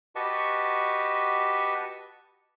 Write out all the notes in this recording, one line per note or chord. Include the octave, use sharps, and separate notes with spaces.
F#4 G4 B4 D#5 A5 C#6